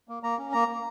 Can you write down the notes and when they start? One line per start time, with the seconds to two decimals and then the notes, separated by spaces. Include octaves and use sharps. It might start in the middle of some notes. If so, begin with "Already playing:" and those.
0.09 A#3
0.23 A#3 A#5
0.38 C#4
0.52 A#3 A#5
0.68 A#3